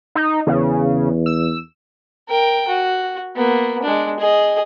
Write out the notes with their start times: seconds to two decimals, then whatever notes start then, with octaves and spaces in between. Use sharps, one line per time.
0.15 D#4
0.47 E2 C#3
1.26 E6
2.28 A#4 G5
2.68 F#4
3.36 A#3 B3
3.83 G#3 D4
4.19 G#4 D#5